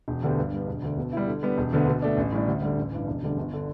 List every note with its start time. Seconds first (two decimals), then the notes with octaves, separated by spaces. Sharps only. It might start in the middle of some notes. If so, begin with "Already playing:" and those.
0.08 E1
0.22 D2 D3 B3 G4
0.38 G2
0.52 G3 B3
0.67 E1
0.82 D2 D3
0.97 B2
1.13 G3 E4
1.27 D3
1.43 G3 B3
1.58 E1
1.73 D2 D3 B3
1.88 B2
2.02 A3 D4
2.17 A1
2.32 A2 G3 D4
2.47 D2
2.62 D3 G3
2.77 A1
2.92 G2 E3
3.07 E1
3.22 D2 D3 G3
3.37 G1
3.53 D3